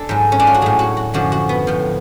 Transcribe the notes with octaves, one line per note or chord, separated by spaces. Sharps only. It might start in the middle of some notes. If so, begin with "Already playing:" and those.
Already playing: D4 A4
G#2 F#3
C#4
D4
F4
F#4
A2 F#3 G#4
F#4
F#4
F#2 D3 F3 F#4
F#4
B3
A2 F3